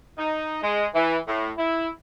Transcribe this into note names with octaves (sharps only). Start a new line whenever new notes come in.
D#4
G#3
E3
A2
E4